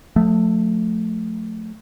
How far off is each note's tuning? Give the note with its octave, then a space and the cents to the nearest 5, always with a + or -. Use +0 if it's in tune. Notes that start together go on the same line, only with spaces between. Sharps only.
F3 +40 A3 +0